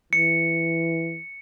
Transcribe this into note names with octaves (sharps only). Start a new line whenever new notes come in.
E3 C#7